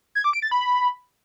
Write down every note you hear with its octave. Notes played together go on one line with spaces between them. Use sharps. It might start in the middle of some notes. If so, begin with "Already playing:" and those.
G#6
D6
D7
A6
B5